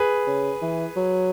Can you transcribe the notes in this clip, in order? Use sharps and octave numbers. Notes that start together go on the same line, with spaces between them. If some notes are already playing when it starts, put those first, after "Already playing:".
Already playing: G#4 B4
C#3
E3
F#3